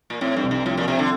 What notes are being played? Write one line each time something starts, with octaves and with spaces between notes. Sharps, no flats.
A#2
A2 C4
G2
C2
G2
A2 F3
A#2
C3 C4
D3